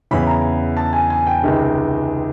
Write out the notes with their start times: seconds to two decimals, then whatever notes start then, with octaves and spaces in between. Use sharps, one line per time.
0.11 E2 C#3 E3 B5
0.27 A#5
0.77 A5
0.93 G#5
1.10 G#5
1.27 G5
1.43 C#2 C3 D#3 G#3